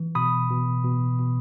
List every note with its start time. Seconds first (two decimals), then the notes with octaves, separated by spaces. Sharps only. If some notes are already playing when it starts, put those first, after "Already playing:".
Already playing: E3
0.15 B2 B5 D#6
0.50 B2
0.85 B2
1.19 B2